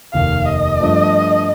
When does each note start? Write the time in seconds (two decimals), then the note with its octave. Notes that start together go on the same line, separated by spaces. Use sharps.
0.14 F1 D#2 D#3 F5
0.45 D#5
0.79 G2 F3 A3